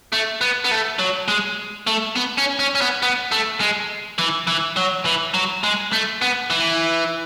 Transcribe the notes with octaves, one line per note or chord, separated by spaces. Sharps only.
A3
B3
B3
A3
F#3
G#3
A3
B3
C#4
C#4
C#4
B3
B3
A3
G#3
E3
E3
F#3
E3
F#3
G#3
A3
B3
E3